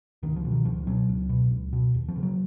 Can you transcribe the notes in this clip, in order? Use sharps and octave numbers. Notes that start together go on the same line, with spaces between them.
C#2 D#3
F3
B2
D#3
C#2 F3
B2 F#3
C#2
B2
C#2
B2
D#2
F3
C#3
F#3